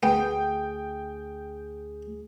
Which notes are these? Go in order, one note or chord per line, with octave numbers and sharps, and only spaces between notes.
D2 B3 G#4 G5